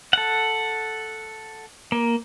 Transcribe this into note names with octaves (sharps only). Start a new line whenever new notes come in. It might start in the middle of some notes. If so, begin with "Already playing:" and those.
A4 F#5
A#3